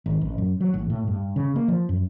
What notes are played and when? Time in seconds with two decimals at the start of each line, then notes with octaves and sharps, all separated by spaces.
0.06 G#1
0.21 A1
0.38 F#2
0.61 F#3
0.74 A1
0.90 A2
1.08 G2
1.36 C#3
1.56 A#3
1.68 F3
1.89 F#2